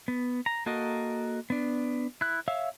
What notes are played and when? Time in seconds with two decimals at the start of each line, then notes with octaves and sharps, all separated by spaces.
0.08 B3
0.46 A#5
0.66 A#3 F#4 A4 A#4 D#5
1.50 B3 D4
2.21 E4 F#6
2.48 C#5 E5 F5 E6